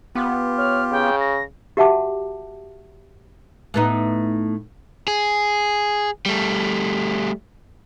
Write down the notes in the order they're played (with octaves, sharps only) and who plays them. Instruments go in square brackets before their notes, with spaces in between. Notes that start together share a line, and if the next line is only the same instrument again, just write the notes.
[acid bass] B3 [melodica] F4 G4
[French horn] C#5 [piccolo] F6
[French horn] C#3 [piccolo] G5
[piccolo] A#6
[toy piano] F#4 G4 E5 F#5 A5 D6
[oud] A2 B3 D#4
[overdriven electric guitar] G#4
G3 A3